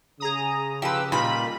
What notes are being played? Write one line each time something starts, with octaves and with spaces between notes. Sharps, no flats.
C#3 G#4 A#5 D#6
F3 G4 B4 E6
A#2 G3 D#4 F4 B5